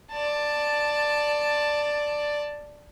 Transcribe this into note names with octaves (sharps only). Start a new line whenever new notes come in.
D5 A5